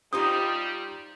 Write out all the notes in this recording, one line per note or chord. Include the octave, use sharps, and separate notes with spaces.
G3 D#4 F4 G4 C5 D#6